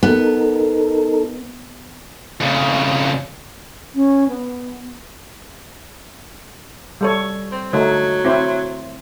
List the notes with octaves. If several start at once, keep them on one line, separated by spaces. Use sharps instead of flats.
B3 D#4 A4 A#4
F2 C#3
C#4
B3
G3 A4 C#5
C4
D3 F#3 A3 D#4
C4 E4 C5